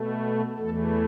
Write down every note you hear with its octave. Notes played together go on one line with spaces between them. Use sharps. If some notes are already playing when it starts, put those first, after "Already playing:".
Already playing: B2 A3
E2 E3 A3 A4